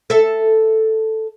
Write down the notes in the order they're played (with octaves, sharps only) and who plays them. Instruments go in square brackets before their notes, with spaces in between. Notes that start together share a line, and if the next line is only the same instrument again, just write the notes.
[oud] A4 E5